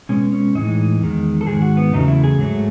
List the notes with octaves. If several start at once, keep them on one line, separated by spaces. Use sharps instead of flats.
B2 G#3 C#4
C#4
A2 E3 G#3 D#4
E2 D#3 G#3
A4
G#2 D#3 G#3 G#4
F#4
B3
E2 C#3 F#3 A3 D#4
E4
G#4
G#2 F#3 A3